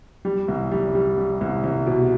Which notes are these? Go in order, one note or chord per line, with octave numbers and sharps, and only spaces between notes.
G3
C2
G3
G3
G3
C2
C2
B2